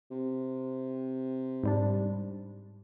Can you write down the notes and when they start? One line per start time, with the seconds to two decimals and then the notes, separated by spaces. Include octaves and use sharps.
0.11 C3
1.64 G#2 G3 D4